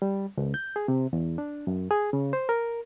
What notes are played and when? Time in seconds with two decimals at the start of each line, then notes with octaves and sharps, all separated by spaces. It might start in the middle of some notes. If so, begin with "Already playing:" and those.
0.02 G3
0.37 C#2
0.54 G6
0.76 G#4
0.88 C3
1.13 E2
1.38 D4
1.67 F#2
1.91 G#4
2.13 C#3
2.33 C5
2.49 A#4